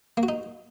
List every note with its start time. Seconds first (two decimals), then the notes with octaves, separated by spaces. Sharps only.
0.17 A#3
0.23 F#4
0.28 D#4